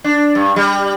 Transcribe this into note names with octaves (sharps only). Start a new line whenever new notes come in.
D4
G2
G3